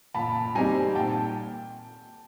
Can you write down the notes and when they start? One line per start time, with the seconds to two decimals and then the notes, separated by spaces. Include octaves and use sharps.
0.14 A#2 A5 B5
0.55 G3 C4 D#4 G4 G#5 A#5
0.95 A#2 G5 A5